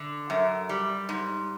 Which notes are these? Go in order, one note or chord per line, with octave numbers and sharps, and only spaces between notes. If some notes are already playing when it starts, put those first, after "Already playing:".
Already playing: D3
F#2
G3
G#2